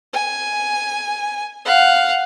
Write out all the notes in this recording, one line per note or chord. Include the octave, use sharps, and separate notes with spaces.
G#5
F5 F#5